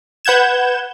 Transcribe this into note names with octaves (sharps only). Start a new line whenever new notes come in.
B4 F#5 G6 G#6 E7